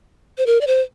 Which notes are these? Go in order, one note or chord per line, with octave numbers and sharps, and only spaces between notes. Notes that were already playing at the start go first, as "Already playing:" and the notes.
C5
A#4
D5
C5